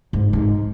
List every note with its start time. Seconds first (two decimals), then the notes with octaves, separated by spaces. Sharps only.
0.13 G#2
0.33 G#2